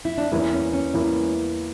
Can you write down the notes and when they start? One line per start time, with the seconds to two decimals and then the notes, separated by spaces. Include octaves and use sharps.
0.05 E4
0.18 D4
0.31 E2 E3 A#3 C#4 E4
0.53 C#4
0.73 C#4
0.94 E2 E3 A#3 E4